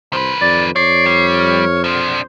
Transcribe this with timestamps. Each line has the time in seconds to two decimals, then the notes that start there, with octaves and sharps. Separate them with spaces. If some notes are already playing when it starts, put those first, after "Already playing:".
0.13 C2 D#3 B4 C5
0.41 F2 D5 A6
0.76 F2 C#5 D5 C7
1.06 G3
1.36 F6
1.84 F3 D4 C5